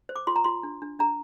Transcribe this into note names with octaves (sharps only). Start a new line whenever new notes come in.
C5
D6
F4 C6
A#5
F4 C6
D4
D4
D4 A#5